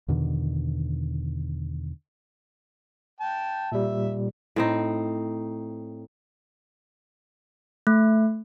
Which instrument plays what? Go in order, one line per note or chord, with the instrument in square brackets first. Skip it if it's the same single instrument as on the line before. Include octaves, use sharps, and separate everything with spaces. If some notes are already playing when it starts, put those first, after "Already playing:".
[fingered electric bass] E2 B2 D3 D#3
[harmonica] G5 A5
[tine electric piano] A#2 G3 [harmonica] E5
[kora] A2 C4 D#4
[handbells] A3